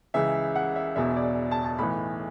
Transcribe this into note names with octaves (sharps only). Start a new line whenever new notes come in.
C#2 C#3 E3 E5
F#5
E5
E1 E2 B2 E5
D5
A5
A5
B1 A2 E3 B5